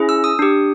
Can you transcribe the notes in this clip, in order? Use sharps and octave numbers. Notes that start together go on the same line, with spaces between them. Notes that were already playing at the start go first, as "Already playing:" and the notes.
Already playing: C#4 E4 G#4
E6
D#6
D4 G4